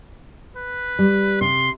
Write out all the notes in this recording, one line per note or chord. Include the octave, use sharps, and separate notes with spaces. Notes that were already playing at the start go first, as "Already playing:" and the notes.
B4
G3
C3 C6